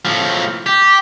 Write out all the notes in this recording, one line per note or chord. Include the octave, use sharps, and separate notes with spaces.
A2 F3
G4